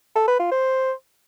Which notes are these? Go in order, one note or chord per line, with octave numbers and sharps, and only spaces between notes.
A4
B4
F4
C5